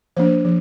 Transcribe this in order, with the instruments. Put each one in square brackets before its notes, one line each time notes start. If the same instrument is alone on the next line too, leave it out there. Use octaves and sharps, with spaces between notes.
[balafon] F3 A#3 D4 C5
F3